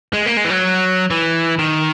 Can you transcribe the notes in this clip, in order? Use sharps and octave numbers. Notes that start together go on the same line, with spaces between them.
G#3
A#3
G#3
E3
F#3
E3
D#3